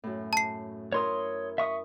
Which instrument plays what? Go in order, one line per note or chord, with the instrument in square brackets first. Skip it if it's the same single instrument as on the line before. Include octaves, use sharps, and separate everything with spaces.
[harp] F#2 A2
[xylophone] A5 C7
[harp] E4 A#4 [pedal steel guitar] C#5 C6 D#6
[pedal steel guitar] E5 C#6 D#6